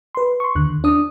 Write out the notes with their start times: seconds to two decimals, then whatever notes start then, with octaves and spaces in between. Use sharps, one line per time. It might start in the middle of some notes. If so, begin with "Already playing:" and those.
0.15 B4 C6
0.40 C6 C#6
0.55 D#2 D3 F#6
0.84 D4 D5 D#6